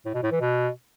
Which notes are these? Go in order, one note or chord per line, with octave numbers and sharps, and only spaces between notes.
A2
B2
A2
E3
B2